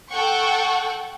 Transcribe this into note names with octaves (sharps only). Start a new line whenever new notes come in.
A4 F#5 G5 C#6